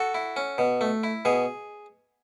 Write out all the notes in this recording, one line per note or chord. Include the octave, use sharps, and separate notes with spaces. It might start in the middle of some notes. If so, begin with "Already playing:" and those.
Already playing: F#4 A4
E4
C#4
B2
A3
E4
B2 G#4